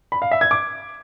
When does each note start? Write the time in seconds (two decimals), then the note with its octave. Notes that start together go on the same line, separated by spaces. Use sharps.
0.12 B5
0.22 F5
0.31 E5
0.41 G#6
0.51 D6